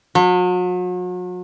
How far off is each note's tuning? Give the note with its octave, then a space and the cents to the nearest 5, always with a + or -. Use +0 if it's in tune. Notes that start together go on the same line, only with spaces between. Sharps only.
F#3 -40